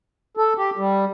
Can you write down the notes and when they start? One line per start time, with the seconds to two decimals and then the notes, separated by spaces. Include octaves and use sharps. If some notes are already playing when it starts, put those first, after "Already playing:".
0.37 A4
0.57 G4
0.77 G3